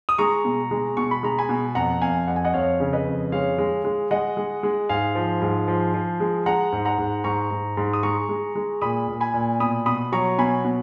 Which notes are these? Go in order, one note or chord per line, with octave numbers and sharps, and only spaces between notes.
D#6
G#3 A#5 C#6
B2
G#3
B2 C#6
B5
G#3 A#5
G#5 B5
B2
F2 F#5 A#5
F2 F5 G#5
F2 F#5
G#5
D#5 F#5
F2 C#5 F5
C#3
B4 D#5
F2
G#3 C#5 F5
G#3
G#3
G#3 D#5 F#5
G#3
G#3
G#2 F5 G#5
F3
G#2
F3
F3
G#3
G#3 F#5 A#5
G#2
F#5 A#5
G#2
G#2 A#5 C#6
G#2
G#2
D#6
G#3 A#5 C#6
G#3
G#3
A#2 B5 D#6
A#2
G#5 B5
A#2
B2 B5 D#6
B2 B5 D#6
F#3 A#5 C#6
B2 G#5 B5
B2